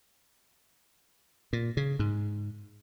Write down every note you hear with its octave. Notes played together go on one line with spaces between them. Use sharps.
A#2
C#3
G#2